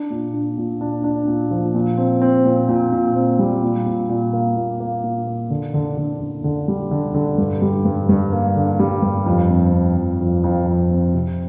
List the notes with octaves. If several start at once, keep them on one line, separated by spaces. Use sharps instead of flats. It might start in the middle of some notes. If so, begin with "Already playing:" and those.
Already playing: D4
A#2
D4
A#2
D4
D4
A#2
F3
A#2
C4
C4
A#2
A#2
A#2
C4
G3
A#2
A#2
A#2
A#3
A#2
A#3
A#2
A#3
D3
D3
D3
D3
D3
G3
D3
D3
G2
G3
G2
G2
A#3
D3
G3
G2
F2
C4
C4
F2
F2
F2
F2
C4
C3